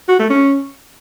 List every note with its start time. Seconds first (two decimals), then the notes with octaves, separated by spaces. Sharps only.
0.09 F#4
0.19 A3
0.30 C#4